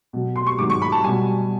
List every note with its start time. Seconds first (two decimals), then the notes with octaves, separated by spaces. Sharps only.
0.13 B2 F#3
0.36 C6
0.47 C#6
0.59 G#2 D#3 F#3 D6
0.70 C#6
0.82 B5
0.92 A5
1.04 B2 G3 G#5